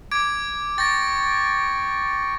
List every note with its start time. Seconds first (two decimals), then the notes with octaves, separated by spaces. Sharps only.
0.11 D6 G#6 D7
0.78 G5 C#6 A6 A#6